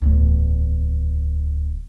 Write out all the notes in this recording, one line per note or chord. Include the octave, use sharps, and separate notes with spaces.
D1 E2